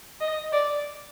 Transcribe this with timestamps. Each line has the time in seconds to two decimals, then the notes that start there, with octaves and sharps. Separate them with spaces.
0.21 D#5
0.53 D5